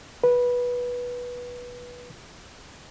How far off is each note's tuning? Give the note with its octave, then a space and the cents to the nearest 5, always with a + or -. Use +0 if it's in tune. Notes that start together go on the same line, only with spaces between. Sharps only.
B4 -15